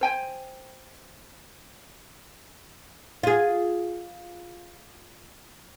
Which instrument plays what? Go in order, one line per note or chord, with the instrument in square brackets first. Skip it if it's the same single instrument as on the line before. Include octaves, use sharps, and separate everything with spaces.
[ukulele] C5 G5 G#5
[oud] F4 G#4